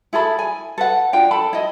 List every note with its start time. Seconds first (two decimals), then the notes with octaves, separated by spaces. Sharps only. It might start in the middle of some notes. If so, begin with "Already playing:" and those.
0.13 E4 G#4 A4 B5
0.39 G#5
0.78 A4 B4 F#5
1.13 D4 F4 G5
1.31 A4 A5 B5
1.53 E4 D#5